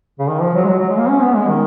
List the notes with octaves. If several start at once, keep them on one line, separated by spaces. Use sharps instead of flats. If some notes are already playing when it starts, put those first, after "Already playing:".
C#3
D#3
F3
F#3
G#3
F#3
F#3
G#3
A#3
C#4
B3
G#3
D#3